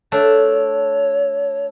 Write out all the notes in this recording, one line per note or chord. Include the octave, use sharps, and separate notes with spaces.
A3 D4 C#5